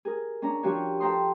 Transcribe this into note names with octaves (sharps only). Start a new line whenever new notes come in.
G#4 A#4
C#4 D4 A#5
F3 D4 F#4 G4 C#5
A4 C5 G5 A#5 C6 D#6